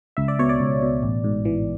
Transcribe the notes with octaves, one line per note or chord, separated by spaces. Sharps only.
C#2 E5
D5
B2 C#5
D5
C#2
B2
A1
G#2
E3